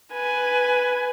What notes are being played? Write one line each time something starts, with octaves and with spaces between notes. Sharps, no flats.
B4 G#5